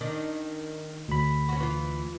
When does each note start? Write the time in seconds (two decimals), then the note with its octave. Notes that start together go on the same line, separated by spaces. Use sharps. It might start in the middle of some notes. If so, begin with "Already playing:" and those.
0.01 D#3 D4
1.08 D2 B5
1.49 C#4 F#4
1.60 E3 F4